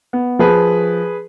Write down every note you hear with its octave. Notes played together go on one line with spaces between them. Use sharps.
B3
F3 G#4 B4